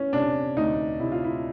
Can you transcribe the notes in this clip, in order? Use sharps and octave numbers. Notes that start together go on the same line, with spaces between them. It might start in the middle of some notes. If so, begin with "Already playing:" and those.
Already playing: E3 C#4
C3 D4
D2 D#4
C3 E4
F4
E4